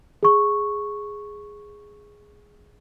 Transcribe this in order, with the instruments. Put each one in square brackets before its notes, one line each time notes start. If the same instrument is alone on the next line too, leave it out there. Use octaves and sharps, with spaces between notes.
[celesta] G#4 C#6